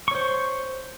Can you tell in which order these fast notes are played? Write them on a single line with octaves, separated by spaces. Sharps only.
C#6 C#5 C5